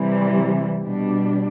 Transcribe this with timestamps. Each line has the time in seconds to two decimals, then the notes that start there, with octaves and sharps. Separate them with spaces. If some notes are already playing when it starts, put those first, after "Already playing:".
Already playing: C3 E3 G3
0.82 B2 G3 D4